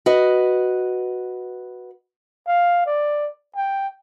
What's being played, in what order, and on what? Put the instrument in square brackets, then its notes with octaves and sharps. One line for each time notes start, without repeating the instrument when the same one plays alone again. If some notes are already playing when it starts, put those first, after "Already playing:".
[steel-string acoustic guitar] F#4 B4 D#5
[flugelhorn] F5
D5
G5